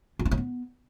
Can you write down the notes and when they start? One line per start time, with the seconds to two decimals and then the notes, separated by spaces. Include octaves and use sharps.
0.19 F4
0.25 E4
0.31 C#4
0.37 B3